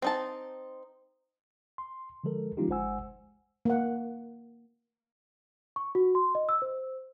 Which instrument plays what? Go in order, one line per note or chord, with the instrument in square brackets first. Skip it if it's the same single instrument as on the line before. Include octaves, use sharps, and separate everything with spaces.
[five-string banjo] C4 D#4 A5
[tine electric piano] C6
D3 F3 G#3 A4 A#4
F3 G#3 C#4 D#4 F4 G4
G1 G#3 C5 F#5 G#5 E6
[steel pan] A#3 F#5
[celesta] C#6
F#4
C6
D#5
E6
C5